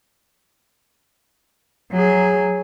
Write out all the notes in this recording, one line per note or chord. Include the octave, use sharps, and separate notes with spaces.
F#3 G#4